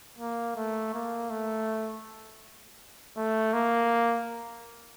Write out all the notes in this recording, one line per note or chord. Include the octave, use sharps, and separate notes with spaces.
A#3
A3
A#3
A3
A3
A#3